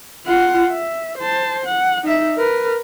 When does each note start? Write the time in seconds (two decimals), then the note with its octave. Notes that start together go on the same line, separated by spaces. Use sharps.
0.26 F4 F#5
0.71 E5
1.18 C5 A5
1.65 F#5
2.04 D#4 E5
2.38 A#4 B4